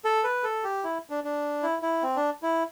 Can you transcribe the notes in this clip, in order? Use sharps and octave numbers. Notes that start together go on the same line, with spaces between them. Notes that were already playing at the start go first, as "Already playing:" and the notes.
A4
B4
A4
G4
E4
D4
D4
E4
E4
C4
D4
E4